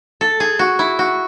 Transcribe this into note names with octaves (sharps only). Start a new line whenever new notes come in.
A4
G#4
F#4
E4
F#4